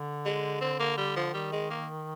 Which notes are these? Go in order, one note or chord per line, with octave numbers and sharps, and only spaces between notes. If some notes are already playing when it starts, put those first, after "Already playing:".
Already playing: D3
G#3
C4
A#3
G3
F3
D#3 G3
G#3
A#3